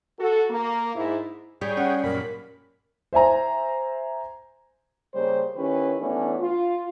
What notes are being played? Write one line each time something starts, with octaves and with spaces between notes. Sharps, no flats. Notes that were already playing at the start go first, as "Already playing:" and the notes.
F#4 A4
A#3
G#2 E4
G3 G#4 C#5 G5
C#4 F#5
F#2 A#2 A#4 B5
C5 E5 G#5 A#5
C#3 G3 A#3 C#4 C5
D#3 C#4 E4 G4 B4
E3 A3 B3 C#4 D4
F4